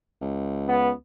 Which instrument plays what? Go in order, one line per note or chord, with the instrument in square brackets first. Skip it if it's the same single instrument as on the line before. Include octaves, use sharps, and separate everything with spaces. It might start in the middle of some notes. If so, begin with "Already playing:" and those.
[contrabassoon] C#2
[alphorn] B3